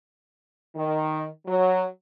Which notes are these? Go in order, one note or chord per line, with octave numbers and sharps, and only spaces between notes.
D#3
F#3